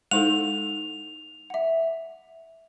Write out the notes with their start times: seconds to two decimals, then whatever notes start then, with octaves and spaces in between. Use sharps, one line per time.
0.11 G#3 D#4 E4 A4 C5 F#5 F7
1.50 E5 F#5